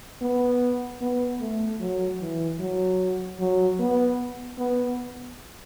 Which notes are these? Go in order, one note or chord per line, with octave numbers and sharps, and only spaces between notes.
B3
B3
A3
F#3
E3
F#3
F#3
B3
B3